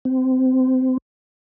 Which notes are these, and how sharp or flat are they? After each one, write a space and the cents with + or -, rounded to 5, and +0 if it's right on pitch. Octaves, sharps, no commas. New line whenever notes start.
C4 -20